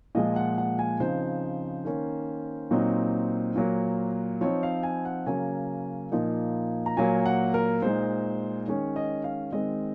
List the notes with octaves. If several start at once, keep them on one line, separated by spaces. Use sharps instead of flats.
A#2 F3 G#3 D#5
F#5
F#5
G#5
C#3 F3 C4 D#4 C5
D#3 A#3 C#4
A#2 F#3 C4 D#4
A#2 F#3 A#3
F3 C4 D#4 C#5
F5
G#5
F#5
C#3 F#3 A#3 C#4 G#5
A#2 F3 A#3 D#4
A#5
A#2 F#3 A#3 G#5
F#5
A#4
A#2 G#3 D#4 C5
D#3 G#3 C#4 C#5
D#5
F5
D#3 G#3 C4 D#5